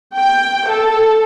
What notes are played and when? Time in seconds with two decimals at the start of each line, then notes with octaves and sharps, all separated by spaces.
0.17 G5
0.69 A4